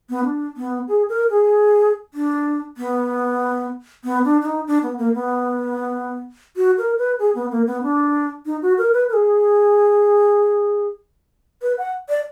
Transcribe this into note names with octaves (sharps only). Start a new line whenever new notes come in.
B3
D4
B3
G#4
A#4
G#4
D4
B3
B3
D4
D4
D#4
D4
B3
A#3
B3
F#4
A#4
B4
G#4
B3
A#3
B3
D4
D#4
F#4
A#4
B4
A#4
G#4
B4
F#5
D5